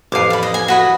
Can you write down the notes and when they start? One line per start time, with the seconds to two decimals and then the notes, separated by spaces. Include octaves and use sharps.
0.12 A1 F2 F5 D6
0.30 D5 B5
0.43 D#5
0.54 G#5
0.68 F#4 B4 D#5